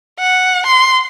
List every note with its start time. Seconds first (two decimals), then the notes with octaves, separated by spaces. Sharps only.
0.19 F#5
0.66 C6